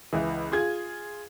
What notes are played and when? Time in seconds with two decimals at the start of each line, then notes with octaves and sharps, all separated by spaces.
0.13 C#2 E3
0.52 F4 G#4 G#6